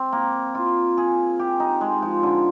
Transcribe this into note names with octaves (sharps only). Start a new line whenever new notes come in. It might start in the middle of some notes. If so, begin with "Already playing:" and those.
Already playing: C4
A#3
F4
G#4
G4
D#4
G#3
F3
D3